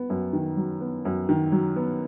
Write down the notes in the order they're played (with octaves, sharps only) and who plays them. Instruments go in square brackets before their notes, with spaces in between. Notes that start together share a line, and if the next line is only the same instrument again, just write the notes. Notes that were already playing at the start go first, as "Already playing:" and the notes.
Already playing: [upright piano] B3
F#2
D#3
F#3
B3
F#2
D#3
F#3
B3